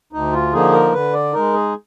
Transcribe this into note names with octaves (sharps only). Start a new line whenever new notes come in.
D2 D#4
F4
D3 F3 A#3 D#4 G#4
A#4
D3 B4
D5
G#3 D#4 A#4
G#4